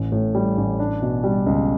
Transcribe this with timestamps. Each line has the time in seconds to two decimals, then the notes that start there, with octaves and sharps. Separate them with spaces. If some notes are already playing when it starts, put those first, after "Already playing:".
Already playing: A1
0.12 A2
0.35 G3
0.57 A1
0.79 D4
1.02 B2
1.24 G3
1.46 C#2